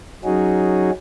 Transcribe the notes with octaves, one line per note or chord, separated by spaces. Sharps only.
F#3 C#4 D#4 F#4 G#4